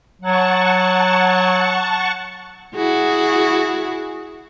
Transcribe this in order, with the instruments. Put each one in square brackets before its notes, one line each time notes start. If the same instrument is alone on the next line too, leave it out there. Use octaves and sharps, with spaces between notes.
[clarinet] F#3 [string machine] F#5 A5 C#6
[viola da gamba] E4 F#4 G#4